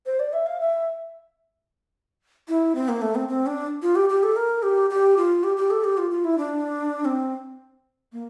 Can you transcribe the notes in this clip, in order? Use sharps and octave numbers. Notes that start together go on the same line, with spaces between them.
C5
D5
E5
F5
E5
E4
C4
A#3
A3
C4
C4
D4
F4
G4
G4
A4
A#4
G4
G4
F4
G4
G4
A4
G4
F4
F4
E4
D4
C4
A#3